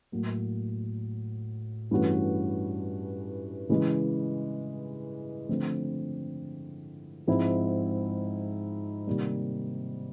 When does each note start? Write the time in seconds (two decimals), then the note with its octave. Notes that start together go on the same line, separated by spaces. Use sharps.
0.12 A2 F#3 A#3
1.91 G2 E3 A3 C#4 F#4
3.69 C#3 E3 G#3
5.49 D3 F3 A3 C4
7.27 G#2 F3 G#3 C4 E4
9.07 C3 D#3 G3 A#3